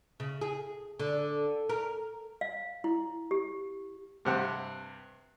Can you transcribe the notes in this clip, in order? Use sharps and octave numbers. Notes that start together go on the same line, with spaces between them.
C#3
G#4
D3
A#4
F5
E4
G4
G2 C3 F#5